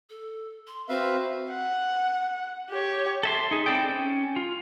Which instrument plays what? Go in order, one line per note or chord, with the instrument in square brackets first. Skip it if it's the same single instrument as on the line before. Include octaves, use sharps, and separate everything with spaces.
[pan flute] A4
C6
[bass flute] C4 [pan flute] F#4 [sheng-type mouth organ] B4 E5 F5
[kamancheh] F#5
G4 C#5
[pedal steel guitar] A4 E5 C6
D#4 G#4
C4 E4 A4 D5 G5
C#4
F4